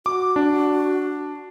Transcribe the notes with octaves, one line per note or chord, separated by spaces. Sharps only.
F#4 D6
D4